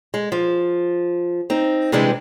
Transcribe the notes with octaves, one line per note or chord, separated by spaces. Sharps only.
G#3
F3
C4 D#4
C3 E3 G3 G#3 D4